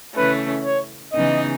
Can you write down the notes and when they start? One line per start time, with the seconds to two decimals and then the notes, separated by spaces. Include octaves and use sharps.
0.15 C#3 E3 A3 C#4 B4
0.64 C#5
1.12 C#3 E3 B3 D#4 G#4 D#5